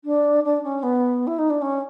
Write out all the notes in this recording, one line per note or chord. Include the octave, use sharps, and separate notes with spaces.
D4
D4
C#4
B3
E4
D#4
D4
C#4